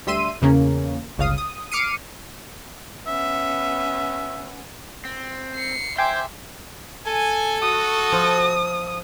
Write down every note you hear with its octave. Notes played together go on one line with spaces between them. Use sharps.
D2 G3 E5 C6 E6 D#7
E2 C#3 A#3 C#4
G1 C#2 C#3 F5 D#6
D#6
D6 F6 C7 C#7 D#7
B3 C#4 E5
C4
C7 C#7
C5 E5 G5 G#5 C6 D6
A4 G#5
F#4 D#6
F3